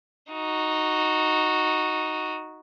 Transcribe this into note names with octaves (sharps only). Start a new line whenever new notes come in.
D#4 F#4